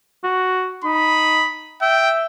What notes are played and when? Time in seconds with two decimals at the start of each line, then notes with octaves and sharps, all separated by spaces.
0.24 F#4
0.84 D#4 B5
1.82 E5 G5